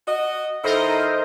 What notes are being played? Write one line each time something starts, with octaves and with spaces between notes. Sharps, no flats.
F#4 D#5
D#3 E4 A4 A#4 C5 D#5